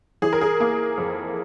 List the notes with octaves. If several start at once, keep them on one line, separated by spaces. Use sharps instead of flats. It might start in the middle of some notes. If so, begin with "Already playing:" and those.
E3 G#4
A#4
G#4
A#3
F2